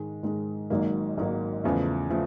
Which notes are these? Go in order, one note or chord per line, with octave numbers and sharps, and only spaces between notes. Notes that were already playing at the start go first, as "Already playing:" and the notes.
Already playing: G#2 D#3 G#3
G#2 D#3 G#3
G#1 G#2 D#3 F#3 A#3
G#1 G#2 D#3 F#3 A#3
E2 C#3 F3 A3
C#3 F3 A3